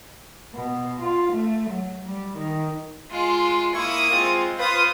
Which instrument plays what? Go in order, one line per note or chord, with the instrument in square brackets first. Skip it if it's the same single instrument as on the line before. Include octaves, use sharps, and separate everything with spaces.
[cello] B2
F4
A3
F#3
G3
D#3
[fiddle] G#3 F4
[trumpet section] A#3 E4 [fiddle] C#6 D#6
[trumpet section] G#3 C4 F4
[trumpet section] F4 C5 [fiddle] B4 D#6